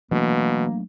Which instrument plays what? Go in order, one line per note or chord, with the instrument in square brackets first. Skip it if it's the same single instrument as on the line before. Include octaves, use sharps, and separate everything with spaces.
[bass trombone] B2 [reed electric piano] E3 [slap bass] F#3 A3 D4 [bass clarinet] A#3